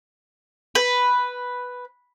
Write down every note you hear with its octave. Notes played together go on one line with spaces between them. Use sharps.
B4